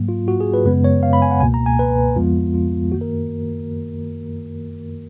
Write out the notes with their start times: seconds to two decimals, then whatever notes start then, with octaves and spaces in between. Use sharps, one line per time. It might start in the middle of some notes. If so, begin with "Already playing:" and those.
Already playing: G#2 F#3 A#3
0.09 F4
0.28 F#4
0.40 G#4
0.54 B4
0.65 F#2 C#3 G#3 B3 B4
0.84 C#5
1.03 F5
1.13 B5
1.22 G#5
1.31 F#5
1.40 C#2 B2 A#3 G#5
1.54 A#5
1.66 G#5
1.79 B4
2.16 F2 F3 G#3 B3 F4
2.54 F4
2.92 F#2 D#3 A#3 F#4
3.01 A#4